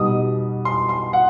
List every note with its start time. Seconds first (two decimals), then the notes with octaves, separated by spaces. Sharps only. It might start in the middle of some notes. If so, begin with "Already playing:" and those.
Already playing: B2 G3 D#4 D#6
0.65 C6
0.89 C6
1.13 F#5